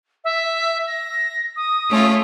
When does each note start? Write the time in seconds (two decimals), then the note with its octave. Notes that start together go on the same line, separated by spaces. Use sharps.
0.24 E5
0.87 A#6
1.56 D#6
1.88 A3 C#4 F4